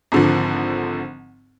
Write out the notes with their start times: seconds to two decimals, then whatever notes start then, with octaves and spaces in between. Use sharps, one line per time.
0.12 G#1 D3 F3